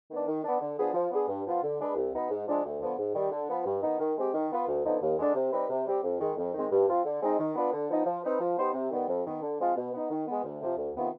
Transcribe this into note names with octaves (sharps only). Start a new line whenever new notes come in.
D#3 B3 D4
D#3
B3 D4
D3
F3 B3 D4 G#4
F3
B3 D4 G#4
G2
F3 B3 F4
D3
G#3 D4 G#4 B4
C2
B2 B3 D#4 B4
G#2
F3 G#3 D4
D2
D3 F3 B3
G#2
D#3 G3
D3
F3 B3 F4 B4
G2
D#3 B3 D#4
D#3
G#3 C4 G4
D#3
B3 F4 B4
D2
D3 F3 B3 D#4
D#2
D3 G#3 D4
C3
G3 C4 D#4 B4
C3
G3 C4 G4
F2
D#3 G#3
F2
D#3 G#3 C4
G2
F3 C4 F4
D3
G#3 C4 D#4
D#3
B3 D4 F4 B4
D3
F3 B3 D#4
F3
C4 D#4 B4
F3
B3 D#4 G4 C5
C3
D#3 G3 B3
F2
D#3 B3
D3
F3 G#3 C4 F4
B2
B3 D#4
D#3
G#3 B3
D2
C3 F3
D2
C3 D#3 B3 F4